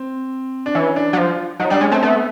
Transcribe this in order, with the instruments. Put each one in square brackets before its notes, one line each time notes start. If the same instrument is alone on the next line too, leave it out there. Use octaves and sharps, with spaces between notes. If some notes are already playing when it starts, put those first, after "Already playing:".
Already playing: [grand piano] C4
D4
[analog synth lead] E3 [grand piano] C#4
[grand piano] D4
[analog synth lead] F#3
[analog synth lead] F3 [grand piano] F4
[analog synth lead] F#3 [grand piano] D#4
[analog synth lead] G3 [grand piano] D4
[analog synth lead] G#3 [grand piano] C#4
[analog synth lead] A3 [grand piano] C4
[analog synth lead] A3 [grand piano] B3